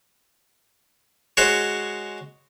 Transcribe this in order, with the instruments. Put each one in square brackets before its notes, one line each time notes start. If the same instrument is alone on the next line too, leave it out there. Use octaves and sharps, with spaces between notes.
[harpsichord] G#3 F#4 C5 C#5